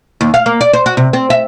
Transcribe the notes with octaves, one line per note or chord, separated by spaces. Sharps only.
D#2
F5
A#3
D5
C5
F#4
C3
C4
E5